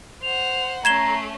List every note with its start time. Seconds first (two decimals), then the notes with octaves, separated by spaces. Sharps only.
0.23 C5 F#5 F7
0.85 A3 C#4 A#5 G#6 C7 E7 G7